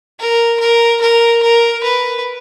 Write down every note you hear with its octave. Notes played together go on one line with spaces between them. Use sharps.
A#4
A#4
A#4
A#4
B4